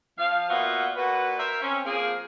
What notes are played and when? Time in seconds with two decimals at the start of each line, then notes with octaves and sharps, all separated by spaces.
0.18 F3 F5
0.50 A#2 B3 F4 F#4 E5
0.95 A#2 F#4 B4
1.39 A#4 C5 E5
1.62 C4 C#4
1.85 F3 A#3 C4 G#4